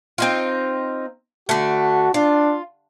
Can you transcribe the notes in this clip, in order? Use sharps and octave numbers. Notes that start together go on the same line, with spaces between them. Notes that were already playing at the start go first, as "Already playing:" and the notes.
C4 D#4 F4
D3 A3 F#4
D4 F4